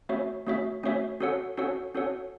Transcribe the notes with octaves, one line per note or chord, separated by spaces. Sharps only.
A3 C#4 F#4 C#5 E5
A3 C#4 F#4 C#5 E5
A3 C#4 F#4 C#5 E5
C#4 F#4 A4 C#5 F#5
C#4 F#4 A4 C#5 F#5
C#4 F#4 A4 C#5 F#5